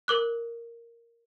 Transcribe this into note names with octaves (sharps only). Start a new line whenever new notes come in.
A#4 D6 F#6